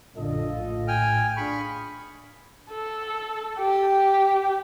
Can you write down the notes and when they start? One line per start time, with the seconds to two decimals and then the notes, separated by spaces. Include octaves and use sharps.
0.17 A#1 F#2 D3 F4 A4 D#5
0.48 A2
0.88 G5 G#5 F6
1.37 D4 F4 G#4 B5 C#6
2.71 A4
3.60 G4